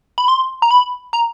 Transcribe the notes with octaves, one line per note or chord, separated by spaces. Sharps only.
B5
C6
A#5
B5
A#5